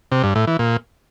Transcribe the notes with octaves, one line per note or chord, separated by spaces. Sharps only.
C3
G2
A2
E3
A#2